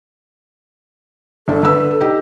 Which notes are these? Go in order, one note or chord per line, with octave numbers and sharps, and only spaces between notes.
G1 D4 A4
D3 B4 E6
D#4 G4